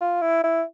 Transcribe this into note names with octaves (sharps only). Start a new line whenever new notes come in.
F4
E4
E4